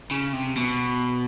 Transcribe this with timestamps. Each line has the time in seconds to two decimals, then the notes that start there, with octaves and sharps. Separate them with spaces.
0.11 C#3
0.33 C3
0.56 B2